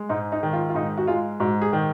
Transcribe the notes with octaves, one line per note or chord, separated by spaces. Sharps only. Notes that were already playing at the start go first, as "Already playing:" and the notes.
Already playing: G#3
G#2 D#4
D#4
D#3
F4
F4
G#2 D#4
F#4
G#3 F4
G#2 F#4
G#4
D#3